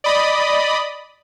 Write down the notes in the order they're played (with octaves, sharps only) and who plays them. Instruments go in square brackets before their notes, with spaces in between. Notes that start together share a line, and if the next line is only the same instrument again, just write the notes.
[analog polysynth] D5 D#5 B5 D#6